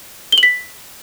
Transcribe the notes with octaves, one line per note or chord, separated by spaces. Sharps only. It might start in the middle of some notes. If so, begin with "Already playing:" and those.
G7
F#7
B6